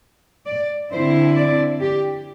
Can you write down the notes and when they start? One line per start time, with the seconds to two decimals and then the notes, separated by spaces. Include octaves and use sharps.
0.46 D5
0.92 D3 C4 E4 C5
1.36 D5
1.81 G4